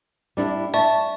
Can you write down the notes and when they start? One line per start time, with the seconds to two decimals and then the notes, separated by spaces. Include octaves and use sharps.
0.37 G3 D4 E4
0.74 D5 E5 A5 C#6